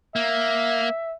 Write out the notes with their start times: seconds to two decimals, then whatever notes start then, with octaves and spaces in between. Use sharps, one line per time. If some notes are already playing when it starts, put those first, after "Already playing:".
0.16 A#3 E5